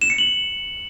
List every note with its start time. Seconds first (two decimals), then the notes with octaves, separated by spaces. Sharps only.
0.02 E7
0.10 C#7
0.18 F#7